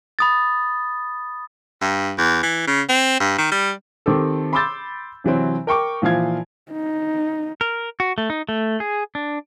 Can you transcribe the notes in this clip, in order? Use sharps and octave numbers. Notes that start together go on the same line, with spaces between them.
B5 D#6 A6
G2
E2
E3
C#3
C4
G2
D#3
G3
D#3 C4 G4 A4
B5 C6 D6 E6 G6 A6
C3 E3 F#3 C4
A#4 G5 C#6 D6
A#2 E3 F3 F5 G#6
D#4
A#4
F#4
A3
D#4
A3
G#4
D4